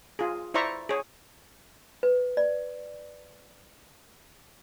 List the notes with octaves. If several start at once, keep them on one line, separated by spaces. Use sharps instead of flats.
F4 G#4
E4 C5 D5 E5 A#5 C#6
G#4 C#5
B4
D5